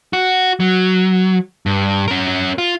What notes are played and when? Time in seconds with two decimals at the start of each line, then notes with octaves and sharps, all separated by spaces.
0.13 F#4
0.60 F#3
1.66 G2
2.08 C#4 A#4
2.58 F4